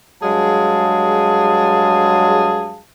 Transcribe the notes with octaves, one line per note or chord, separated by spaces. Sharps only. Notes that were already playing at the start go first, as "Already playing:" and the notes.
G2 F#3 G#3 G#4 F5 A5